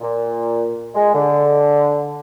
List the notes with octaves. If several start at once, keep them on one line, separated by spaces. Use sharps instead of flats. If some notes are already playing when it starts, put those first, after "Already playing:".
A#2
G#3
D3